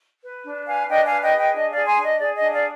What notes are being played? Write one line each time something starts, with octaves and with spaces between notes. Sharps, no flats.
B4
D4
B4 F5 G#5
D4 D#5 G5
F5 G#5
B4
D#5 G5
G#4
D#5 G5
D4 D#5
D5 F5
G#4
G#5 C6
D4
D#5
G#4 D5
D#5
D4
D5 F5